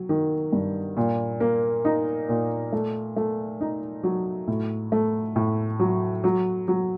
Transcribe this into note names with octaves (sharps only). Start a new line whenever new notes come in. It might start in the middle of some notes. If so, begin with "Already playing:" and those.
Already playing: F#3
D#3
G2
A#2
A#3
D#4
A#2
A3
A3
D#4
F#3
A2
A3
A2
F#3
F#3
F#3